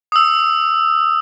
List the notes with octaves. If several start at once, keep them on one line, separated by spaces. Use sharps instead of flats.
D#6 E6